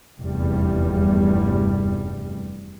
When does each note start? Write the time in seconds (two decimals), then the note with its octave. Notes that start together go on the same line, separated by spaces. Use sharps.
0.22 F1 E2 G2 G3